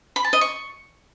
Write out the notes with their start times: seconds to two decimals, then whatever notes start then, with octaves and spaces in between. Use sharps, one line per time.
0.16 B5
0.24 A5
0.33 D#5
0.41 C#6